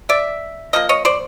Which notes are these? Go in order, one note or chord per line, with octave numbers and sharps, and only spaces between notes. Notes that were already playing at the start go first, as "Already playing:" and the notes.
D5 E5
F3 A#3 D#5
C#5 D#5
C5 D5